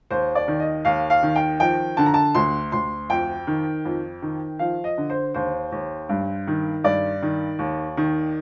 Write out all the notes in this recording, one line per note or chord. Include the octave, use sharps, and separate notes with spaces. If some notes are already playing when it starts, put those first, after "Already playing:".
D#2 C5
D5
D#3
D#5
D#2 F5
F5
D#3
G5
F3 G5
D3 A5
A#5
A5
D2 C6
D2 C6
F2 G5
D#3
F2
D#3
F3 F5
D#5
D3
C5
D#2 C5
D#2
G2
D#3
G2 D5
D#3
D#2
D#3